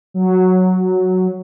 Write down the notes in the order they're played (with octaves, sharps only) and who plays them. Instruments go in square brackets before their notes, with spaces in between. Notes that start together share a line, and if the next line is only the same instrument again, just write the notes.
[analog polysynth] F#3